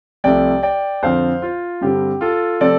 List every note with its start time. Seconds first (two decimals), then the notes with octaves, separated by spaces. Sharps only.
0.24 C2 C3 F3 A3 D5 G5
0.63 D5 G5
1.03 F2 D3 F3 C4 C5 F5
1.42 F4
1.81 G2 D3 G3 C4 G4
2.21 F4 A4
2.60 C3 F3 A3 C4 A4 D5